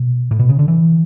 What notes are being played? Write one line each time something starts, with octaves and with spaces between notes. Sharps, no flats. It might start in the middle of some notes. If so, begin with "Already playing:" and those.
Already playing: B2
A2
B2
C#3
D3
E3